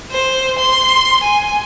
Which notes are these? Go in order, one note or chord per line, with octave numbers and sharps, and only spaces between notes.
C5
C6
G#5